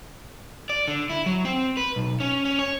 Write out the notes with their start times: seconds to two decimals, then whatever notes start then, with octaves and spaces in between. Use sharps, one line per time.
0.70 D5
0.88 D3
1.10 E4
1.26 F#3
1.45 C4
1.77 B4
1.96 B1
2.20 C#4
2.45 C#4
2.59 C#5